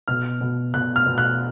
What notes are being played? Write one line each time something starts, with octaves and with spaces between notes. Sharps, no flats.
B2 F6
B2
B2 F#6
F6
B2
F#6